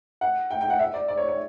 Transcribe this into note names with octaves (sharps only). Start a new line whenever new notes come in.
F#5
G5
G5
F#5
E5
D5
D5
C#5
C#5